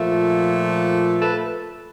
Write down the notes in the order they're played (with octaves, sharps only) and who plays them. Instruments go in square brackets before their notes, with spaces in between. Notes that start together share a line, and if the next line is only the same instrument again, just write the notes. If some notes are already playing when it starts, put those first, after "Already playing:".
Already playing: [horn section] A#2 F3 A3
A4 B4